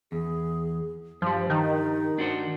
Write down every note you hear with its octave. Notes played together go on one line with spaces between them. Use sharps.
E2 G#4
G2 F3 G3 C5
D#3 D#4
D4 F#4 C5